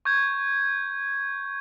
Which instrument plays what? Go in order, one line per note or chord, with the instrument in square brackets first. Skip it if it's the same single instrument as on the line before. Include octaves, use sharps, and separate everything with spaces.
[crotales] C#6 G6 G#6